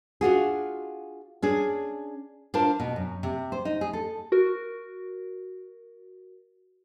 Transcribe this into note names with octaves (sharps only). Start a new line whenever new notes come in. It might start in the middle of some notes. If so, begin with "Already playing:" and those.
D4 F4 F#4 G#4
C#4 D4 G#4
D4 F4 A#4 C5 A5
B2
F#2
C3
C5
D#4
G#4
A4
F#4 A#4